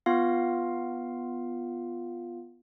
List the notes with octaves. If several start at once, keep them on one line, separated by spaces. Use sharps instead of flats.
B3 F4 F5